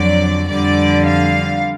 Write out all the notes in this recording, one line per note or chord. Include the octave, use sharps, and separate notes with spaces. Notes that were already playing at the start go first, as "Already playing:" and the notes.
Already playing: F2 D3 F#3 D5
F2 D3 G3 D5
F5